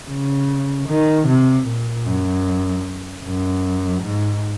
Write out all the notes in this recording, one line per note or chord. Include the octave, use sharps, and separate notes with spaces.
C#3
D#3
C3
A#2
F#2
F#2
G#2